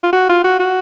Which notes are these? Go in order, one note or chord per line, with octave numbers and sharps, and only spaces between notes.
F4
F#4
F4
F#4
F#4